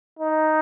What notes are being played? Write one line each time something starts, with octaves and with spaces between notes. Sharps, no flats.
D#4